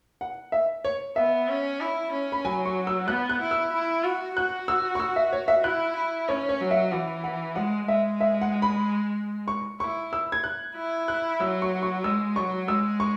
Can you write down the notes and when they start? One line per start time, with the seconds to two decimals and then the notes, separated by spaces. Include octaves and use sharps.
0.21 F#5
0.52 E5
0.85 C#5
1.16 B3 E5
1.49 C#4
1.80 E4
2.12 C#4
2.32 B5
2.44 F#3 G#5
2.65 C#6
2.87 E6
3.08 B3 F#6
3.30 F#6
3.41 E4
3.51 E6
3.72 E4
4.04 F#4
4.36 F#4 F#6
4.68 E6
4.95 C#6
5.00 E6
5.16 E5
5.33 C#5
5.48 E5
5.64 E4 F#6
5.96 E4
6.29 C#4 C#5
6.49 C#5
6.60 F#3
6.71 E5
6.92 E3 F#5
7.24 F#5
7.56 G#3 F#5
7.88 G#3 E5
8.21 E5
8.41 F#5
8.62 B5
9.48 C#6
9.80 E4 C#6
10.13 E6
10.32 G#6
10.44 F#6
10.76 E4
11.08 F#6
11.40 F#3 E6
11.62 C#6
11.83 C#6
12.04 G#3 E6
12.36 F#3 C#6
12.68 G#3 E6
13.00 C#6